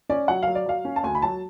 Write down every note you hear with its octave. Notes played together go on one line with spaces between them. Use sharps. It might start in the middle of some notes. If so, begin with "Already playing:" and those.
C#4 D5
F#3 F#5
F#3 F5
D5
F#3 F5
C#4
A5
D2 G#5
B5
F#3 A5